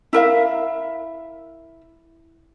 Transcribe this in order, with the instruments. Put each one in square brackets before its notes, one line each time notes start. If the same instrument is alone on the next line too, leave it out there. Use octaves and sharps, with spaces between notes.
[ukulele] E4 A#4 E5 F5